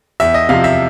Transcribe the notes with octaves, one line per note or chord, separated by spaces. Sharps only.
E2 E5
D#5
C3 F3 F5
E5